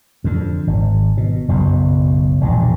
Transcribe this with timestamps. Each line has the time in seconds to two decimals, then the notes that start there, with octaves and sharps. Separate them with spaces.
0.24 F2 D3
0.67 G#1
1.17 B2
1.48 F#1 B1 F#2
2.41 E1 A#1 G2